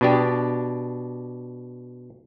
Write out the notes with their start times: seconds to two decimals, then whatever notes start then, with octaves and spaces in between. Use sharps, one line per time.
0.01 B2 D4 G4